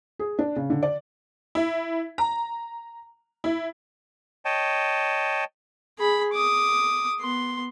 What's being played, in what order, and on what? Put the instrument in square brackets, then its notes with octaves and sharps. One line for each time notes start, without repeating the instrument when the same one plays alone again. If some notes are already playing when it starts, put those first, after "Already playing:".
[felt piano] G#4
D4
C#3
D3
D5
[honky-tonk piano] E4
A#5
E4
[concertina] C#5 D#5 G5 A5
[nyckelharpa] G#4 B5
D6 D#6
B3 C6